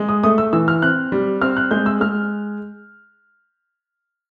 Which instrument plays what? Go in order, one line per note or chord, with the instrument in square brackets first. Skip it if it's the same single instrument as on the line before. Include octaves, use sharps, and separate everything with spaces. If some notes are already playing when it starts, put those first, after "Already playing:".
Already playing: [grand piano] G#3
D#6
A3 D#6
E6
E3 E6
F6
C4 F#6
G3
C4 F6
F#6
G#3 G6
E6
G#3 F6